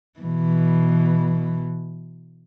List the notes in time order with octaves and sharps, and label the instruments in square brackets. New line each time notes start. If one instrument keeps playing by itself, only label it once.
[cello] B2 E3